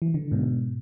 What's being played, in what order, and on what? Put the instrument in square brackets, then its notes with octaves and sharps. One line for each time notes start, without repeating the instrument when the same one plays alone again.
[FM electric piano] E3
D3
G#2 B2